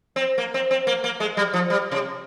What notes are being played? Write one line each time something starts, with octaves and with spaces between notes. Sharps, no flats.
C4
A#3
C4
C4
A#3
A#3
G#3
G3
F3
G3
C3